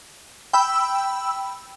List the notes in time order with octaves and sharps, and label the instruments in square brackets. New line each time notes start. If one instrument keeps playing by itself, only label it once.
[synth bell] G5 B5 E6